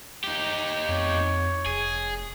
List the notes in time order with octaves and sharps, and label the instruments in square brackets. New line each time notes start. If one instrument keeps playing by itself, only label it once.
[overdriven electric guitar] D#4 G4
[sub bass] F2 [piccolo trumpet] C#5
[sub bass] F1 [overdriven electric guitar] G#4